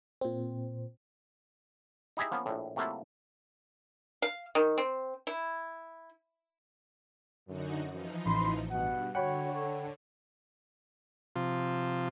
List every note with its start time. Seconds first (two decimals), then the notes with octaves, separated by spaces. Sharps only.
0.21 A#2 C4
2.17 D#4 E4 G4 G#4 D#5 E5
2.31 F3 A#3 B3 C#4 B4
2.46 A#1 A2
2.76 C3 F#3 A3 A#3 E4 F4
4.22 F5
4.55 D#3
4.78 C4
5.27 E4
7.47 F#2 D3 D#4 F#4
7.90 E3 F3 D#4
8.26 A1 B5 C6
8.70 G2 B2 F#5
9.15 D3 F#4 C#5 F#5 G5 B5
9.53 A4 C#5
11.36 C3 F3 F4